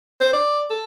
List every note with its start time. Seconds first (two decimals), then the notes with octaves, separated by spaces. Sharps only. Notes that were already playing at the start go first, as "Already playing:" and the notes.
0.21 C5
0.33 D5
0.70 A4